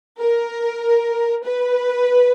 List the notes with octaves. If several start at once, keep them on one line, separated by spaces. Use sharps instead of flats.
A#4
B4